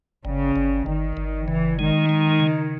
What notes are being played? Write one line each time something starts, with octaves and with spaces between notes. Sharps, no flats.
G1 C#3
G1
G1 D#3
G1
C#3 E3
D#3 G#3
G#3
C#3